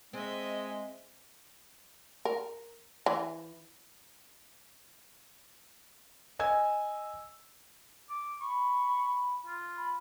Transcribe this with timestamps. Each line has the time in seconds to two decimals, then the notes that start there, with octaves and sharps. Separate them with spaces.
0.13 G#3 C4 D#5 E5
2.25 A#4
3.06 E3
6.39 D#5 G#5 E6 G#6
8.09 D6
8.41 B5 C#6
9.46 F4
9.77 B5